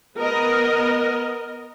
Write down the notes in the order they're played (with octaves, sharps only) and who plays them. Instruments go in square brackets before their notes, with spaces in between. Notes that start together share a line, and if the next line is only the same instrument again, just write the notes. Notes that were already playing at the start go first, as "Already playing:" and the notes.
[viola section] B3 A#4 D#5